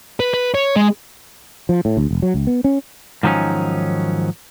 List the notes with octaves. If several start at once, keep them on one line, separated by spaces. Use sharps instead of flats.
B4
B4
C#5
G#3
F3
A2
D2
F1
F#3
C#2
B3
C#4
G#2 D#3 F3 F#3 C#4 D#4